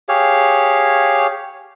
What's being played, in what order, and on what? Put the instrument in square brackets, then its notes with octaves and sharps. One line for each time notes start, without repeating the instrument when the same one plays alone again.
[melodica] G4 G#4 C#5 F5